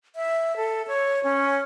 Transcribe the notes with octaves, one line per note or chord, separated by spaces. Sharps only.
E5
A4
C#5
C#4